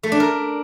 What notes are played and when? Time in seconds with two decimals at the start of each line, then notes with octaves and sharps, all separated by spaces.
0.03 A3
0.12 D4
0.20 A#4